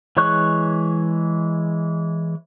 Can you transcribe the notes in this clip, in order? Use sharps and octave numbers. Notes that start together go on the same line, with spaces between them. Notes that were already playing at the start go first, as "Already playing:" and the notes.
E3 G#3 C#5 C#6 F#6